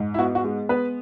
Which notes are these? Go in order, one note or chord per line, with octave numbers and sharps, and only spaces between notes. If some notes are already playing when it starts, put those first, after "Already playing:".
Already playing: G#2
E4
B3 F#4
F#4
G#3
B3 B4